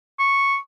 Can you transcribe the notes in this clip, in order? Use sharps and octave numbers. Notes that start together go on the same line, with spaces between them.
C#6